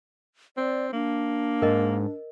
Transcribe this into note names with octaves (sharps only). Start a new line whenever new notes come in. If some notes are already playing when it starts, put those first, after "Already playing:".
C4 D5
A#3 D4
G#2 A#4 D#5